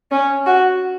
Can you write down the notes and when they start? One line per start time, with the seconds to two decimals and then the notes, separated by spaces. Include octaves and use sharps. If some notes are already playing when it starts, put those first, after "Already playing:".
0.11 C#4
0.46 F#4